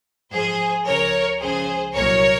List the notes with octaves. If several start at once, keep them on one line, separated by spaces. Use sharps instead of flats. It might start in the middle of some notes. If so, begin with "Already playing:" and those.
G#2 F3 G#4 C5
C#2 C#3 F3 A#4 C#5
C#2 C#3 F3 G#4 C5
C2 A#2 F#3 A#4 C#5